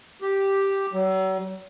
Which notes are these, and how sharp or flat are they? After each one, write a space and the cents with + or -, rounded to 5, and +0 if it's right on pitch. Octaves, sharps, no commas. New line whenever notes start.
G4 -5
F#3 +40